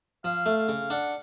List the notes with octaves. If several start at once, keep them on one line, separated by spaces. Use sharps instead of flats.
F3 F5
A3
F5
C#3
D4 F#5